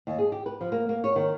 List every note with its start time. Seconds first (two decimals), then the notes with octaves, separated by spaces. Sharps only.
0.07 D#2
0.19 G#4
0.32 G4
0.46 B4
0.61 F3
0.72 A#3
0.89 A#3
1.04 C#5
1.16 D#3